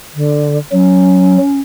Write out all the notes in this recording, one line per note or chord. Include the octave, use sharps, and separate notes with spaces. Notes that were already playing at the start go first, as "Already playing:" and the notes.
D3
F#3 C#4